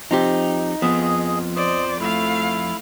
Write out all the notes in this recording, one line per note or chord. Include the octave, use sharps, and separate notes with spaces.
F3 C4 D#4 G4
F2 F3 B3 G#4 D#5
C5 D5 D#5
A3 E4 F5